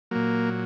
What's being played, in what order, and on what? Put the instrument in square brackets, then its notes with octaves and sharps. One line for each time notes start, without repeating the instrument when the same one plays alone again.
[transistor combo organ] A#2 F#3 A#3